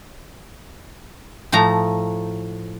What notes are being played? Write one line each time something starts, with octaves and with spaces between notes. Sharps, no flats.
A2 F3 A3 A#5